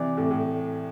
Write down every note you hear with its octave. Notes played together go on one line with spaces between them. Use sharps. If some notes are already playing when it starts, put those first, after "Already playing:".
Already playing: C3 E3 D5
A2 C3
A2